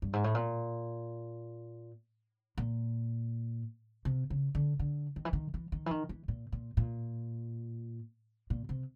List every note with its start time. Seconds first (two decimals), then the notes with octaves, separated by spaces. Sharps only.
0.02 G2
0.13 G#2
0.24 A2
0.35 A#2
2.58 A#2
4.05 C3
4.30 C#3
4.55 D3
4.79 D3
5.16 D#3
5.25 E3
5.33 D#3
5.54 E3
5.72 D#3
5.86 E3
5.91 D#3
6.09 E3
6.28 A#2
6.52 A#2
6.77 A#2
8.50 A#2
8.69 C3